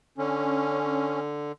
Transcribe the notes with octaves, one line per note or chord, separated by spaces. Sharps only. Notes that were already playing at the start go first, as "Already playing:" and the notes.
D3 C#4